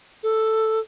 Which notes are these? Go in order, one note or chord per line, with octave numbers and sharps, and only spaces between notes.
A4